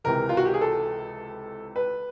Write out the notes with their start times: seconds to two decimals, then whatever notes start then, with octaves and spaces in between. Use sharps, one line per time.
0.04 C#2 C3 E3 A#4
0.29 F4
0.37 F#4
0.45 G4
0.54 G#4
0.62 A4
1.76 B4